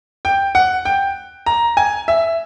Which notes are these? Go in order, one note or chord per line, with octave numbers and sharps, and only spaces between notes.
G5
F#5
G5
A#5
G#5
E5